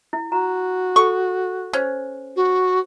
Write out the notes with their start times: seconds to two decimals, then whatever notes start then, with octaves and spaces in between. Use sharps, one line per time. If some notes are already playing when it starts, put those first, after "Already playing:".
0.13 E4
0.32 F#4 A#5
0.96 A4 C#6
1.73 C#4 C5
2.36 F#4